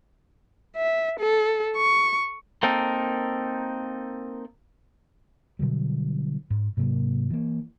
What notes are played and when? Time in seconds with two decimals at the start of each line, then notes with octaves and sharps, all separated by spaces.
0.76 E5
1.20 A4
1.77 C#6
2.63 A#3 C4 D#4 A4 A#4
5.59 B2 D3 F#3 G3
6.50 G#2
6.77 G#2 C3 F#3 A#3
7.30 E3 A#3